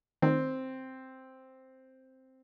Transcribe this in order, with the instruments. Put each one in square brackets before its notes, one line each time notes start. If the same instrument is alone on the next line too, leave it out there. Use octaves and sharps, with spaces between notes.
[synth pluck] D#3 [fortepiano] C4